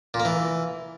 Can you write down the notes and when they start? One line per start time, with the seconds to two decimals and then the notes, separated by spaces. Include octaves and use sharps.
0.14 A#2
0.20 A#3
0.25 E3